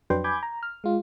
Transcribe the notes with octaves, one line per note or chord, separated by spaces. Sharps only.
F2 F#3 D4 B4 G5 C6
G#5 B5 D6 G6 G#6
A#5
F6
G#3 F4